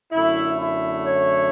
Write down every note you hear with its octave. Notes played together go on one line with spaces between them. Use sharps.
F#2 D3 A3 E4
E4
C#5